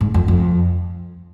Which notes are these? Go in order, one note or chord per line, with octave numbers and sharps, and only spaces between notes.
G#2
F2
F2